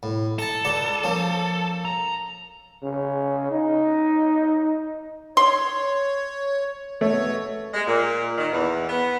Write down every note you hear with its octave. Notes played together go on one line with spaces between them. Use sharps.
A2
A4 A5 A#5
C#2 D5 A#5
F3 A#3 C#4
A#5
C#3
D#4
C#5 C6
B2 A3 C#5
G#3
A#2
D#3
E2
B3